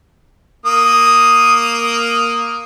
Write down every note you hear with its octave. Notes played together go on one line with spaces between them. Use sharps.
A#3 D#6